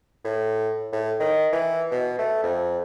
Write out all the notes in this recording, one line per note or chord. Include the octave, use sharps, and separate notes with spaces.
A2
A2
D#3
E3
B2
A3
F2